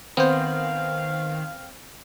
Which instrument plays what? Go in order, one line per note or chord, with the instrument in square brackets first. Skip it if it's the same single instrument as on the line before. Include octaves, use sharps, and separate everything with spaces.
[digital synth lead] D#3 [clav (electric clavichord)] B3 C5 [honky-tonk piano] C4 [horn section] F5